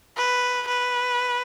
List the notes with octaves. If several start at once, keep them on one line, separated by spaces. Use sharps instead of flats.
B4
B4